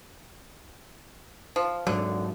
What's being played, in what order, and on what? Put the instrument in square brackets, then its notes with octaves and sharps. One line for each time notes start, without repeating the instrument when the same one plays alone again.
[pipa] F3
[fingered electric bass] G#2 F#3 [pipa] D3